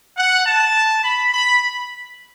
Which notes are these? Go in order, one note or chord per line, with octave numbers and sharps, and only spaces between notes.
F#5
A5
B5
B5